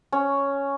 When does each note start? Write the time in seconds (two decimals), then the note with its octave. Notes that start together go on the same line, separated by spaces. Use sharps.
0.12 C#4